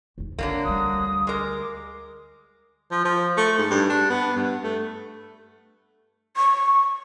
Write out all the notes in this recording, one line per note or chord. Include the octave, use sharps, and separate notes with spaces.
E2 D#4
B1 D3 F#3 A#3 C4
D2 G3 D#6
G#3 A#4 D6
F3
F3
A3
G#2
G2
D4
B3
G2
A3
C#6